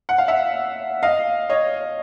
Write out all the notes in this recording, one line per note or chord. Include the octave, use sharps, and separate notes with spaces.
F#5
F5
E5 F#5
D#5 F5
C#5 D#5